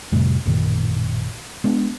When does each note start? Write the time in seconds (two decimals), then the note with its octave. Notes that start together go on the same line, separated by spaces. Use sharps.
0.12 F2 A2 C3 G3
0.46 A1 F#2 A#2 D#3
1.64 G#3 B3 D4